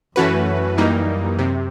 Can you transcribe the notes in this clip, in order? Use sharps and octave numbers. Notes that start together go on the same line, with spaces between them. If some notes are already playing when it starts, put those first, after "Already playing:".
F#2 E3 A3 C#4 F#4 B4
E3 G3 A#3 D#4
C3